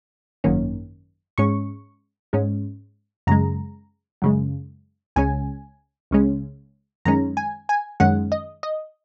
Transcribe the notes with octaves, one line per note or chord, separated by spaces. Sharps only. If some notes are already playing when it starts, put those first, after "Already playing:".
G#1 F#2 D#3 A#3 C#4
G#2 G#3 C#4 C#6
G#2 G#3 C#4
F#2 C#3 G#3 A#5
F#2 C#3 G#3
C#2 C#3 G#3 C#4 G#5
C#2 C#3 G#3 C#4
F#2 D#3 G#3 C#4 A#5
G#5
G#5
F#2 D#3 G#3 C#4 F#5
D#5
D#5